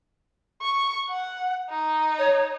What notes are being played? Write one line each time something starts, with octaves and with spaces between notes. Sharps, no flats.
C#6
F#5
D#4
C#5